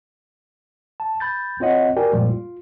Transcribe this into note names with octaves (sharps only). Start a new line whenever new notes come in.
A5
B5 G6 A6
C4 F4 C#5 D#5 F#5
F#4 G4 A#4 D5 G5 G#5
F#2 A#2 F3 G3 G#3 A#3
F4